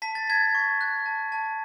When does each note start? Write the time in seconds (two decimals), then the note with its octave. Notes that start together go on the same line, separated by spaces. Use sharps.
0.02 A5 B6
0.15 A6
0.27 A5 G#6 B6
0.55 C#6
0.81 F#6
1.06 A5
1.32 A5